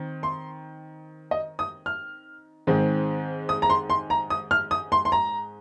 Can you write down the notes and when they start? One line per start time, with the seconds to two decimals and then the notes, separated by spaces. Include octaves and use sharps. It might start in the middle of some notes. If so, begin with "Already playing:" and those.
Already playing: D#3 C4
0.23 C6
1.31 D#5
1.59 D#6
1.86 F6
2.67 G#2 D#3 G#3 C4
3.49 D#6
3.62 A#5
3.70 C6
3.90 C6
4.10 A#5
4.30 D#6
4.51 F6
4.71 D#6
4.92 C6
5.05 C6
5.12 A#5